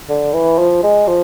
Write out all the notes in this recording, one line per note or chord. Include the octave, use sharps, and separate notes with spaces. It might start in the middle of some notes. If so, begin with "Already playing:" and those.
D3
E3
F3
G#3
F3